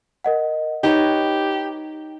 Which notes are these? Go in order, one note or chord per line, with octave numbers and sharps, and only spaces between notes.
A#4 D#5 F#5
D#4 G4 B4 C#5 G5